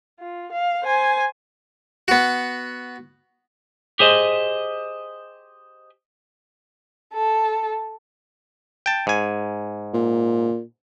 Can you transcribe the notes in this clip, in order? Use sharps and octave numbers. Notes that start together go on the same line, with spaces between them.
F4
F5
C5 G#5
B3 F#4
G4 G#4 C5 D#5
A4
G5 A5
G#2 G#5
A#2